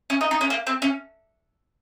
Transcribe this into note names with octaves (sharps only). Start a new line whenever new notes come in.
C#4
D#4
D#4
C#4
A#3
C4
C#4